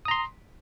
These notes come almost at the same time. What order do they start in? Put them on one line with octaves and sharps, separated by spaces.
D#6 A#5 C6